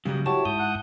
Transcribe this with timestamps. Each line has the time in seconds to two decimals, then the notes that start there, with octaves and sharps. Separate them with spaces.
0.05 C#3 F#3 G3 B4 D#5
0.26 E4 F#4 G4 C#5 A5
0.45 G#2 D#6 G6
0.59 F#5